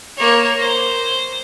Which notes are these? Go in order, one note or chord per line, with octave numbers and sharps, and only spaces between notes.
A#3 C#5
C5